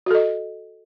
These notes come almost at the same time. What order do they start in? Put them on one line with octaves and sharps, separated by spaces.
F#4 A4 D#5